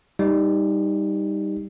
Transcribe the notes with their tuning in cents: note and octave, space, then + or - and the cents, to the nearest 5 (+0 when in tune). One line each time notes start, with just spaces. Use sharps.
G3 +10 D#4 +5